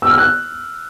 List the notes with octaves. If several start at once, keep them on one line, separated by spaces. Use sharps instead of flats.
E6
F6
F#6